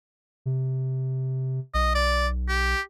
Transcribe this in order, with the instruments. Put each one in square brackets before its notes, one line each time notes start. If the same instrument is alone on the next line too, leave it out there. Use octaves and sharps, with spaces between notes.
[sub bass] C3
[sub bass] B1 [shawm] D#5
[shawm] D5
G4